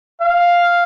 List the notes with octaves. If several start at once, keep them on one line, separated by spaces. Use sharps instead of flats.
F5